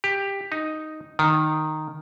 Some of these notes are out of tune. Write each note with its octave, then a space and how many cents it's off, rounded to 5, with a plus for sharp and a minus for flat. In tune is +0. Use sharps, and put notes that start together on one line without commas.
G4 +10
D#4 +0
D#3 -10